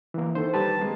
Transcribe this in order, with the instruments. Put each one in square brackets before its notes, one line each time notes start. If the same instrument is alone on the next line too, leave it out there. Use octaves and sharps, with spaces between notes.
[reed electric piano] E3 A#3
[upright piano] D#3 A4 [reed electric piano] C5
[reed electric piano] G3 G4 B4 [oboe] A5
[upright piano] G#3 A#3